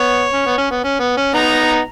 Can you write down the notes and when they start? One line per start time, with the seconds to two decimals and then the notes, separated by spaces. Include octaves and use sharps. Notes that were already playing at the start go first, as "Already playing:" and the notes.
Already playing: B3 C#5
0.33 C#4
0.46 B3
0.58 C#4
0.71 B3
0.84 C#4
1.00 B3
1.17 C#4
1.34 B3 D#4 A#5